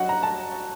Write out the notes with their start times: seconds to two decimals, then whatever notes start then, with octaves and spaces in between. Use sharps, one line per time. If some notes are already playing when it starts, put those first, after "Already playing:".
Already playing: G2 F#3 F#4 D#5 F#5
0.09 A#5
0.23 A5